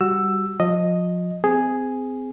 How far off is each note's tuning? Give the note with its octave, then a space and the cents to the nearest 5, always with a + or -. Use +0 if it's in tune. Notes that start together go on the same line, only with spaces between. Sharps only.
G3 -5 F#4 +0 E6 +10
F3 +30 D#5 +0
C4 -30 G#4 +0